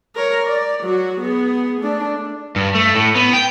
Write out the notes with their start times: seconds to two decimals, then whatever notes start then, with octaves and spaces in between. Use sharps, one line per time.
0.15 A#4 C#5
0.46 D5
0.83 F#3 F#4
1.20 B3 G#4
1.81 A3 D4
2.56 G2
2.75 A3
2.95 A2
3.16 B3
3.33 G5